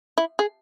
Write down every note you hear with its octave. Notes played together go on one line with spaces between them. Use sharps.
E4
G#4